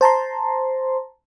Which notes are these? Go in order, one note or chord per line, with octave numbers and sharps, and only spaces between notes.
C5 A5 A#5 C6